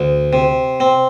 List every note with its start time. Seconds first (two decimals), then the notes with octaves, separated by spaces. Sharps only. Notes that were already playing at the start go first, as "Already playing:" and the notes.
Already playing: D2
0.33 C3
0.80 C4